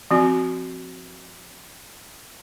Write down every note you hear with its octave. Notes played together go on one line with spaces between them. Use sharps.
F3 C4 F#4